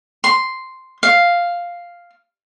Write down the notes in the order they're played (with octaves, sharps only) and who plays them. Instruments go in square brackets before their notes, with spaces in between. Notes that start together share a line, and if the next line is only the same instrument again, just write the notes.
[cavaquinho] C6
F5